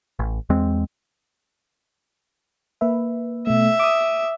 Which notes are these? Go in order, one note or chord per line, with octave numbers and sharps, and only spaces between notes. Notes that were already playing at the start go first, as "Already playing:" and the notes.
A1
E2 G#3 C4
A#3 B4 E5
B2 A3 E5
D6 D#6